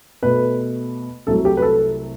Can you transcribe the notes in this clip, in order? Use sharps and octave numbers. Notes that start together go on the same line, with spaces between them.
B2 A3 B4
C2 C3 F#3 A3 A4
G4
B4
A4